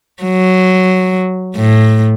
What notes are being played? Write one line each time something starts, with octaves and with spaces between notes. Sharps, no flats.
F#3
A2